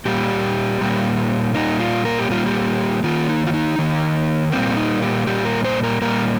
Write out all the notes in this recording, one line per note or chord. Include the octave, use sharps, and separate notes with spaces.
A#2 G3 A#3 G4
A#2 G3 A#3
A#2 G3 A#3 D#4
F4
A#4
G4
A#2 G3 A#3 F4
G4
D#3 A#3 F4
D#4
F4
D#4
D#3 A#3
A#2 G3 A#3 C4
D#4
G4
A#2 G3 A#3 G4
A#4
C5
A#4
A#2 G3 A#3 A#4